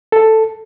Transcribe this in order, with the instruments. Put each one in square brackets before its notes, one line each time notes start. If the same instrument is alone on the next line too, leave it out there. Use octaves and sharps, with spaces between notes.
[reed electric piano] A4